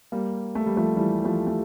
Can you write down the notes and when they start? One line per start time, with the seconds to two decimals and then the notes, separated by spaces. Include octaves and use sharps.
0.12 G3 A#3
0.55 A3
0.66 G3
0.77 F3 A3
0.96 E3 G3
1.24 F3 A3
1.47 A3